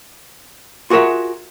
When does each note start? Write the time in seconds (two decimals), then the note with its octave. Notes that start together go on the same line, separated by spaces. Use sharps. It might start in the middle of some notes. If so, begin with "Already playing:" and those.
0.90 F4 F#4 G#4 A#4 E5 F#5